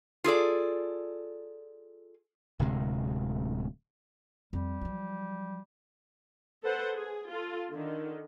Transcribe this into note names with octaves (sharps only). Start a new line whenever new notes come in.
F4 G#4 A4 D5
D1 D2 C3 G#3
F2 G3
F3 F#3
A4 B4 C5 F#5
G#4
F4 A4
D3 D#3